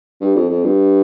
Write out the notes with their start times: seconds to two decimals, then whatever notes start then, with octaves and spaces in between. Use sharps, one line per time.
0.21 G2
0.35 F2
0.49 F2
0.63 G2